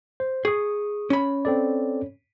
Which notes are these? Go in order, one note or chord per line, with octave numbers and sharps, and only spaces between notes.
C5
G#4 C#6 D#6
C#4 B5
C4 A4 D5